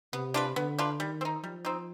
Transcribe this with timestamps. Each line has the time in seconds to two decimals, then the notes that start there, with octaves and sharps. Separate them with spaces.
0.13 C3 B3
0.34 D4 F4 B4
0.56 D3 B3
0.79 D4 F4 B4
0.99 D#3 G3
1.21 C4
1.25 D#4
1.44 F3 G3
1.65 C4 D#4